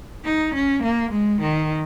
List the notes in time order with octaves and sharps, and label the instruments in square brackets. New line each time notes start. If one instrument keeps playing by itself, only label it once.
[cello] D#4
C#4
A#3
G#3
D#3